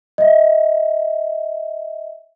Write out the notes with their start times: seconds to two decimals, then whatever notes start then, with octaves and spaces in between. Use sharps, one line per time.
0.18 D#5 E5